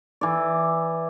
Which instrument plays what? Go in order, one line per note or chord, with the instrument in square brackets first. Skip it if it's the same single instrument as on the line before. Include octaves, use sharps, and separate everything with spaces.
[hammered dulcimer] E3 D5